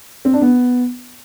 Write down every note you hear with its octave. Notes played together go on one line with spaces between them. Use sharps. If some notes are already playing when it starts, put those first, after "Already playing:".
C4
D4
B3